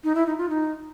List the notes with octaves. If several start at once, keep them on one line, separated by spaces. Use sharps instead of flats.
D#4
E4
D#4
F4
D#4